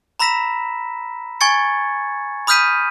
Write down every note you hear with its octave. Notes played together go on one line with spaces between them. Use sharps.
A#5 B5 E6 A#6 B6 E7
G#5 C#6 G#6 A6 C#7
B5 D#6 F6 G6 B6 D#7